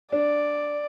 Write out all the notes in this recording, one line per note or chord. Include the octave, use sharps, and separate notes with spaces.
D4 D5